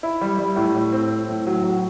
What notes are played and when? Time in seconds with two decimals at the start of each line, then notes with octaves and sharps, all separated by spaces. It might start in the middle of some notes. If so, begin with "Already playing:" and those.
0.03 E4
0.21 G3
0.39 G3
0.56 A2
0.74 A2
0.93 C4
1.10 C4
1.29 A2
1.46 F#3
1.64 F#3